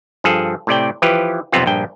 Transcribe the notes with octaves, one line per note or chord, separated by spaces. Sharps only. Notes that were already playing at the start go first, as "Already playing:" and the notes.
G2 F3 G#4 A4
A2 C3 D5 G5
E3 F3 G4 B4
B1 F2 C3 B3 C4 F4
A#1 G2 G5